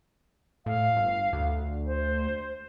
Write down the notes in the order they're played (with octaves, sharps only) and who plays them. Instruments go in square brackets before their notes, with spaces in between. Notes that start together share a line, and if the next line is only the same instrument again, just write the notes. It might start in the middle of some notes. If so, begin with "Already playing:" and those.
[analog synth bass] A2 [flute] F5
[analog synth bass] G1
D2
[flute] C5